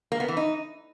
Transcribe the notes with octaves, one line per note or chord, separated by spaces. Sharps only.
A#3
B3
E3
D#4